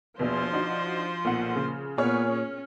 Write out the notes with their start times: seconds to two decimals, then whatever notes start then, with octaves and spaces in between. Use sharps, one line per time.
0.19 A#1 E2 B2 F3 C5
0.53 D4 D#4 F#4
1.25 B1 A#2 F#5
1.56 C#3
1.98 A#2 B3 G#4 C#5 F6
2.31 C#4